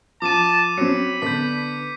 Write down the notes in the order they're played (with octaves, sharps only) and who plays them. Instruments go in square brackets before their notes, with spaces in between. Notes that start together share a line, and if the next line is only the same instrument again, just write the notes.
[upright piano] F3 [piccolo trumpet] A5 [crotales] D6 D#7
[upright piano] F#3 C4 [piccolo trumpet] B5 [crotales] C#7
[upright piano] D3 B3 D4 [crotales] G6 B6